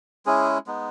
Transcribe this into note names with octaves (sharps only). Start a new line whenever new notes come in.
G#3 C#4 E4 G#4
G#3 B3 D#4